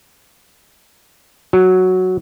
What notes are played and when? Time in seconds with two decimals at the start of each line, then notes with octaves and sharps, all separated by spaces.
1.53 F#3